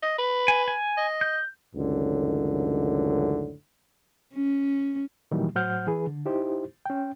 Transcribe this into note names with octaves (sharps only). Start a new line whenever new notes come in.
D#5
B4
G#5
G#5
D#5
G6
C#2 F#2 A2 D3 D#3
C#4
A#2 D#3 E3 F#3 G3 A#3
A2 F#3 C5 F#5 F6 G6
E3 G#4 B4
D3
D#4 E4 G4 C5
C#4 G5